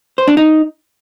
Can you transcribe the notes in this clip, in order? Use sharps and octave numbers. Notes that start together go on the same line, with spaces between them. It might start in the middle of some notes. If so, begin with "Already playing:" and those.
C5
D4
D#4